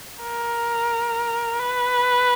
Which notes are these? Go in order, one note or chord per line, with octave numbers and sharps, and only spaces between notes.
A#4
B4